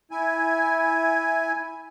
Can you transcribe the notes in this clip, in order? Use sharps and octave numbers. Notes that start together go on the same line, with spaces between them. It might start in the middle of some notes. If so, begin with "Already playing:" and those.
E4 G#5